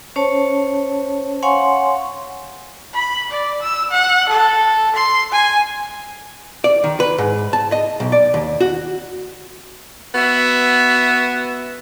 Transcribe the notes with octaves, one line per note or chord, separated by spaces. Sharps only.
C#4 C5 C#5 A5
C#5 F5 F#5 G#5 C6 C#6
B5
D5
E6
F#5
A4
C6
G#5
D5
D#3
B4
G#2
A5
D#5
B1
D5
D#2
F#4
B3 F#4 E5